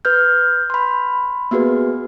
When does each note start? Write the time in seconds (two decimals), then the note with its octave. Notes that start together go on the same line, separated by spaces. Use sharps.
0.05 B4 F6 G6
0.70 B5 C6
1.51 A#3 B3 F#4 G#4 B4